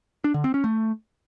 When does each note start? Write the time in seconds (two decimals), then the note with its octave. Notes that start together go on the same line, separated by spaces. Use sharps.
0.24 D4
0.34 D3
0.44 C4
0.54 C#4
0.64 A3